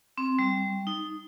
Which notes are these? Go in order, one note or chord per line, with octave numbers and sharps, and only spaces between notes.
C4
G3
D#4